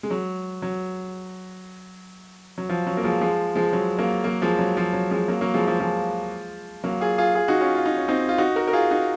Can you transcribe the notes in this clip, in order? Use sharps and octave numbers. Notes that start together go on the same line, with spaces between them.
G#3
F#3
F#3
F#3
F3
F#3
A#3
F3 G#3
F3 G#3
F3 G#3
F#3
F#3 A#3
F#3 A#3
F3 G#3
F#3
F3
F#3
F3 G#3
F#3 A#3
F#3 A#3
F3 G#3
F3
F3 G#3
F#3 A#3
F4 G#4
F4 G#4
F4 G#4
D#4 F#4
C#4 F4
F4
D#4
C#4
C4 D#4
F4
D#4 F#4
F#4 A#4
A#4
F4 G#4
D#4 F#4